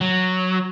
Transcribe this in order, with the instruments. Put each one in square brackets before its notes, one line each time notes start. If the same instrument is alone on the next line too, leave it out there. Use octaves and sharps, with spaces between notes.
[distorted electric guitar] F#3